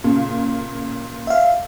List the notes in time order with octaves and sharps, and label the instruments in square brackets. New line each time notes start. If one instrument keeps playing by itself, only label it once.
[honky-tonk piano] A#2 C#3
[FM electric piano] E5 F5